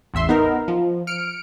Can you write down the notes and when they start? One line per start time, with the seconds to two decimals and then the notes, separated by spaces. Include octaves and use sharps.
0.14 A1 E2 E5 C6
0.29 B3 D#4 A#4
0.68 F3
1.07 F6 C#7 D7